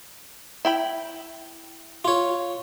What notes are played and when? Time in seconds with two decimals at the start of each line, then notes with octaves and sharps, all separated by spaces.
0.65 E4 G5 B5
2.05 F4 C#5